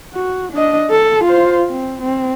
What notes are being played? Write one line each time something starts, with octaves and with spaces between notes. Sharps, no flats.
F#4
D4 D#5
A4
F4 C5
C4
C4